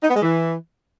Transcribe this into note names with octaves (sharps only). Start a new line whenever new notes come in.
D#4
B3
G#3
E3